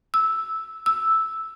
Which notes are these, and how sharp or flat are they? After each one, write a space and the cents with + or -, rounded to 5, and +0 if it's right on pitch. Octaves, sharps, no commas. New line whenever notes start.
E6 -10
E6 -5